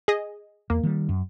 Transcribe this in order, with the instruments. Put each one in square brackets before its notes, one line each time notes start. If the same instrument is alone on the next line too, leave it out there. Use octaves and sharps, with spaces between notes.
[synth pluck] G#4 D#5
[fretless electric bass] E2 [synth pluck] A#3
[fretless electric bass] D#3 G3
F#2